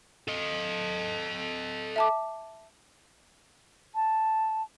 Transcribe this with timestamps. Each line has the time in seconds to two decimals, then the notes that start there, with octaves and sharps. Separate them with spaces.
0.28 A4 D#5
1.96 E5 A5 D6
3.95 A5